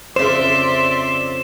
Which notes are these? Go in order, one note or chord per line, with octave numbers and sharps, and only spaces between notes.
F2 C#3 C5 D5 E5 C6 E7